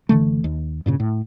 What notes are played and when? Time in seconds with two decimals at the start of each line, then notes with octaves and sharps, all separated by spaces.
0.09 F#1 D3 E3 A3
0.44 D#2
0.86 G2 A#2 C#3
1.00 A2